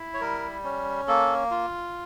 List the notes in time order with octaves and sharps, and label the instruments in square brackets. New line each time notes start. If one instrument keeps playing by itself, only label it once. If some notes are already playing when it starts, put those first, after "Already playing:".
Already playing: [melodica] E4
C#5
G3 A#4
C#4
A#3 A4
F4